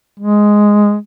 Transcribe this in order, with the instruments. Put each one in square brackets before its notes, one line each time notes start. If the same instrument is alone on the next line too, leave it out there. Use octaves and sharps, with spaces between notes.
[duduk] G#3